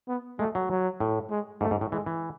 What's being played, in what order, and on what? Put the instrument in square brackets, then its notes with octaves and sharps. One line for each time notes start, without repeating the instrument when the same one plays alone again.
[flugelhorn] B3
[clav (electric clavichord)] G#3 [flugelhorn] A3
[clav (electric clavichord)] F#3
[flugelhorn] F#3
[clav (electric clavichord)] A2
[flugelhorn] G#3
[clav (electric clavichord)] G#2 [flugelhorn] A3
[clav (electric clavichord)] G#2
A2
[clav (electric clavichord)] E3 [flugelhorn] G#3
[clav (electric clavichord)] E3